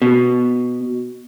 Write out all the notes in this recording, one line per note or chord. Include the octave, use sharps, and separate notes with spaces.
B2